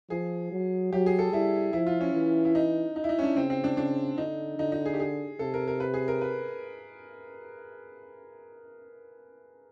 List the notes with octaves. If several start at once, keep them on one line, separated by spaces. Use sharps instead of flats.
F3 G#4
F#3
F#3 G4
G#4
A4
G3 E4
F3 E4
F4
C#4
E3
E4
D#4
D#4
E4
D#4
C#4
D4
C#3 C4
C4
D4
C#3 D4
D3 D#4
D3 D#4
D#4
G#4
G4
G#4
C3 A4
A#4
A#4
B4
G#4
A#4
B4